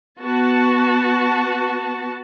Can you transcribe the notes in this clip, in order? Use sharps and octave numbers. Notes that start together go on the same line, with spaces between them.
B3 F#4 A5